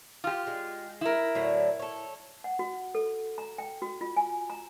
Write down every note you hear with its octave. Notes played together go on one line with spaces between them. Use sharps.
F4 G4
G#3
E4 A#4
A2 D3 F#3
A4 C#5
F#5
F#4
A4
A#5
G5
F#4
F4
G#5
A#5